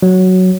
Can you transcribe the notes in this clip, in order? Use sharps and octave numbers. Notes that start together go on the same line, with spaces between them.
F#3